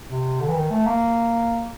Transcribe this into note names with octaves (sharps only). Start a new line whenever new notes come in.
C3
D3
E3
D#3
A3
A#3